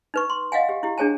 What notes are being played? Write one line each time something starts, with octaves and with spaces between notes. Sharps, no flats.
D#4 B4 C#6
C6
D#5 F5 F#5 G#5
G4
E4 G4
D4 G#4 C#5 G#5 A5